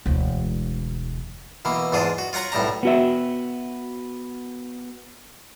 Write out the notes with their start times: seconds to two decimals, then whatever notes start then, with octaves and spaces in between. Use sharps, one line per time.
0.06 E1 D2
1.65 B2 E3 A#3
1.92 E2 G#2 D4 F4 G#4
2.18 F#4
2.33 F4 C#5 F#5 A#5 C#6
2.52 B1 A2 G3 D4 A#5
2.83 B3 F#4 E5